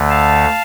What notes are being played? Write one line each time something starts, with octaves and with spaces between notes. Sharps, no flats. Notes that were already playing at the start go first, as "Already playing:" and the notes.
Already playing: D2 D3 A3
F5 A5